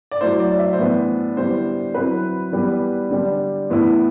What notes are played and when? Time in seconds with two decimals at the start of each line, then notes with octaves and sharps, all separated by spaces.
0.11 D5
0.21 F#3 A3 E4 C5
0.40 D5
0.59 E5
0.73 C5
0.78 A2 E3 B3 D4 D5
1.37 D3 G3 B3 E4 C5
1.95 F#3 C4 E4 B4
2.52 E3 G3 B3
3.11 D3 G3 D4
3.70 A2 E3 B3 E4